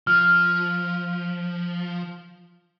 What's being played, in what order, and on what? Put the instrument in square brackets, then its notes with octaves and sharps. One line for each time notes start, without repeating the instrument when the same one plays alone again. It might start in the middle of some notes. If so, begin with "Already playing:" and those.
[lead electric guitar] F3 [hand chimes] F6